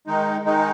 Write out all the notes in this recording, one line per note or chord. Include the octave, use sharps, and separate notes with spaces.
D#3 G#3 D#4
D#3 G#3 D#4